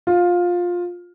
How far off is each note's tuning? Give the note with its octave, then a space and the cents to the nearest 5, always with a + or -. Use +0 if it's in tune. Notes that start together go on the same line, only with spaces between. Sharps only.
F4 +15